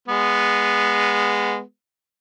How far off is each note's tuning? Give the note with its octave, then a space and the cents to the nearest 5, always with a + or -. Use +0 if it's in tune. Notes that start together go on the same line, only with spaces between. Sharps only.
G#3 -15 B3 -5